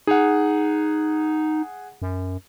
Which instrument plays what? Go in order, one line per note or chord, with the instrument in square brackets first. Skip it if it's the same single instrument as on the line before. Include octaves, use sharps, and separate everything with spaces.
[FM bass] D#4 [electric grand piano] G#4 F#5
[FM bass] F#2